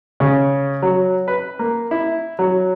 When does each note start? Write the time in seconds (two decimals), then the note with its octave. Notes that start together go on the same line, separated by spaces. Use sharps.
0.20 C#3
0.82 F#3
1.28 B4
1.59 A#3
1.91 E4
2.39 F#3